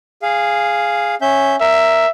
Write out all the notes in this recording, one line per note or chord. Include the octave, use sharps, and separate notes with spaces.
G#4 F5
C#4 E5 G6
A#4 E5